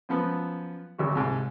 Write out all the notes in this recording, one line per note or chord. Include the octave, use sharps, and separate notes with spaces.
F#2 F3 B3
G#1 D2 F#4
C2 G#2